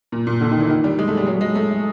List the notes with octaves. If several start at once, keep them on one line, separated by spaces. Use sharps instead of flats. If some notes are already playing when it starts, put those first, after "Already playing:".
A#2
A#2
D3
D#3
E3
D#3
G3
G#3
A3
G3
F#3
G#3
A3